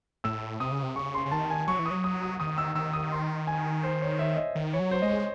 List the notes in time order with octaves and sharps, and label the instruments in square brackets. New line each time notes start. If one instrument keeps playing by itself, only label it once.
[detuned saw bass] A2 [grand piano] E6
[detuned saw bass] C3 [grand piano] D#6
[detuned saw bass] C#3
C3
[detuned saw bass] C#3 [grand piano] C#6
[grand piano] C6
[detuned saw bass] C#3
[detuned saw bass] D#3 [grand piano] A5
[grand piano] G#5
[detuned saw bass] F#3 [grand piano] C#6
[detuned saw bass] E3
[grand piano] D#6
[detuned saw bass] F#3
[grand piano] D#6
D#6
[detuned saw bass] D#3 [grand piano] D#6
[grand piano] E6
[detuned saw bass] D#3 [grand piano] E6
[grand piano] D#6
C6
G#5
C5
C#5
E5
D#5
[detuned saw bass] D#3
[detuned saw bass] E3 [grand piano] C#5
[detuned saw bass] F#3
[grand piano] C5
[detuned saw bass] G#3 [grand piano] D#5
[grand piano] C#5